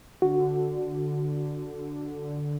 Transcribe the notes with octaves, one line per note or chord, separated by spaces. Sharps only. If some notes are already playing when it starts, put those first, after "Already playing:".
D3 F#4